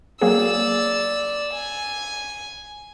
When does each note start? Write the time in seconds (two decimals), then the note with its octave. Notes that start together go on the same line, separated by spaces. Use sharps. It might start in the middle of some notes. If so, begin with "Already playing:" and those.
0.21 F#3 A#3 G#4 D5 E6
1.54 G#5